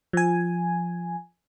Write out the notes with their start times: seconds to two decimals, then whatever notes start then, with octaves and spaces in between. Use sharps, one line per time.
0.13 F3 G#5